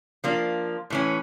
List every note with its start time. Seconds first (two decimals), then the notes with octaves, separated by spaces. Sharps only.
0.24 F3 A#3 D4
0.90 A2 E3 C#4